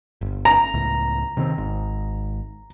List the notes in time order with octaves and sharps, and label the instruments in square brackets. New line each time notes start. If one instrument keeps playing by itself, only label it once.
[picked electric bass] G1
[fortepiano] A#5
[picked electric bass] C#2 A2
C3 D#3 C4
G#1 G#2